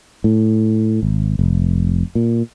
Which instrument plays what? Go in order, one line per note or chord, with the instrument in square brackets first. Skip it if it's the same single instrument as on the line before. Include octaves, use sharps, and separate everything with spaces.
[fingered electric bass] A2
G#1
F1
A#2